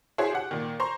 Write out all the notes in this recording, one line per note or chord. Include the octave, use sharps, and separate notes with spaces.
E4 F#4 G#4 C5 C#5
G4 F#5
A#2 D#3
C5 A#5 C6 C#6